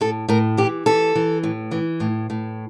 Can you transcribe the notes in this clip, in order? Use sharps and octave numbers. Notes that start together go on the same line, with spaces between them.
A2 A4
A2 A#4
E3 G4
E3 A4
E3
A2
E3
A2
A2